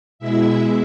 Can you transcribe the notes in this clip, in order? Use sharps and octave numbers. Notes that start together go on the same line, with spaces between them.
B2 G#3 E4 E5